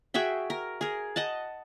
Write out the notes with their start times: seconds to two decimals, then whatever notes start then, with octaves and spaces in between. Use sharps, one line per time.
0.14 F#4 G#4 E5 G5
0.50 A#4
0.81 G#4 A#4
1.16 D#5 F#5 A5